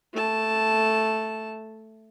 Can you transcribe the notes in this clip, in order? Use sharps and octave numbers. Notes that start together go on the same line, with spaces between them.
A3 A5